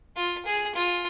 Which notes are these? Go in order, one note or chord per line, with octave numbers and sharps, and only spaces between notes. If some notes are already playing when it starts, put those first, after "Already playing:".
F4
G#4
F4